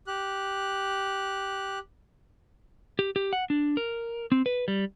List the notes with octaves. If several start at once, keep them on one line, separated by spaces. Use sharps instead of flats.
G4 F#6
G4
G4
F#5
D4
A#4
C4
B4
G3